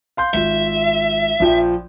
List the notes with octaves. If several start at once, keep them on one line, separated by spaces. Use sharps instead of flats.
F5 C6 G6
G#1 F4 E5
A#1 F3 G5